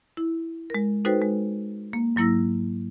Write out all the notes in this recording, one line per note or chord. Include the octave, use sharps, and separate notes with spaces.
E4
G#3 A#4
D#4 F#4 A4 B4 C5 G5
G#3
A#3
G#2 F#3 A#3 E4 E6 A#6